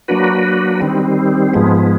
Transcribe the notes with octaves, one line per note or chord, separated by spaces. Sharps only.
F#3 A#3 D4 F#4 B4
D#3 G3 C4
G#2 F3 G#3 B3